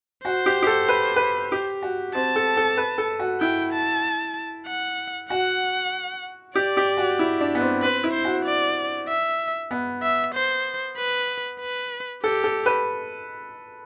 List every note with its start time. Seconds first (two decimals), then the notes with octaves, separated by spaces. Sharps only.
0.25 F#4 C5
0.46 G4
0.63 G4
0.67 A4
0.89 B4
1.16 B4
1.52 G4
1.82 F#4
2.15 C4 A5
2.36 A4
2.57 A4
2.77 B4
2.98 A4
3.19 F#4
3.41 E4 G5
3.73 A5
4.67 F#5
5.30 F#4 F#5
6.55 G4 D5
6.77 G4
6.97 F#4
7.19 E4
7.41 D4
7.55 B3
7.61 C4
7.82 C4 B4
8.04 E4
8.14 C5
8.25 F#4
8.45 D5
9.08 E5
9.71 B3
10.02 E5
10.34 C5
10.97 B4
11.60 B4
12.23 G4 A4
12.44 A4
12.66 B4